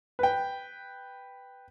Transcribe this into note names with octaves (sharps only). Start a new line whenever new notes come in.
B4 G5